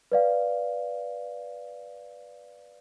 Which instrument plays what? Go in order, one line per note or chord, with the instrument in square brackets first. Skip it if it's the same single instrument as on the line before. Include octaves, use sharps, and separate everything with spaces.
[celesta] B4 D5 F5